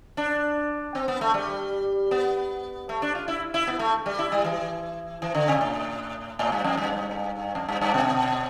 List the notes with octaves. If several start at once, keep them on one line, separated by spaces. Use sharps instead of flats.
D4
C4
B3
A3
G3
B3
A3
D4
F4
E4
E4
B3
A3
G3
E4
G3
E3
E3
D3
C3
A2
A2
G2
F2
G2
F2
G2
G2
B2